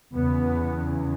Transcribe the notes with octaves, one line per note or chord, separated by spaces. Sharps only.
E2 C#3 B3